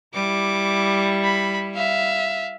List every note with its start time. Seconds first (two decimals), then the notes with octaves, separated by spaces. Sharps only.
0.14 G3 E4 D6
1.24 B5
1.74 E5 F5